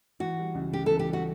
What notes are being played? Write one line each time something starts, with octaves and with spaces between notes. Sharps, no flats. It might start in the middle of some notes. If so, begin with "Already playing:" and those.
E3 F#4
G3
C#2
C#3 G4
E3 A4
G4
G3 F#4